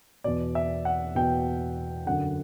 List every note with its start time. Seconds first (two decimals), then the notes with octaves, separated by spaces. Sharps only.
0.24 E2 B2 D5
0.55 E5
0.85 F#5
1.15 E2 B2 G5
2.06 F#2 D3 F#5